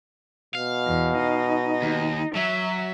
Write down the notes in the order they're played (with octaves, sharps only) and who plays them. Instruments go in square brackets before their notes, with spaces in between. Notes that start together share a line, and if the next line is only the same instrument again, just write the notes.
[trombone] B2 [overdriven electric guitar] F5
[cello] E2
D#4
[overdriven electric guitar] D#2
[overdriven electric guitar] F#3 [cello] E5